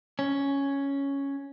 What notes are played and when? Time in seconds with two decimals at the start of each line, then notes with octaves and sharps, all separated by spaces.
0.19 C#4